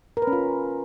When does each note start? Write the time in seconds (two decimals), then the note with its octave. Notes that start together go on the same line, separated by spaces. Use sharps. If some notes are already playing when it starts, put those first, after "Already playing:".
0.17 A#4
0.22 B4
0.27 C#4
0.33 F4